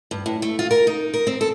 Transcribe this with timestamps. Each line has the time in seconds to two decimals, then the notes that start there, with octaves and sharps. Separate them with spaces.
0.11 G2
0.26 A2
0.42 A3
0.59 F4
0.71 A#4
0.87 D#4
1.14 A#4
1.27 C4
1.41 A4